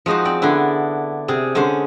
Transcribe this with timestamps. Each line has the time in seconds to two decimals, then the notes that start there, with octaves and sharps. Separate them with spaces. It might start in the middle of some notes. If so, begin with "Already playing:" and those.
0.06 F3 G#3 D#4 F#4 C5
0.25 C4 D5
0.42 D3 B3 D4 E4
1.28 C3 G#4
1.55 D3 G#3 C#4 C5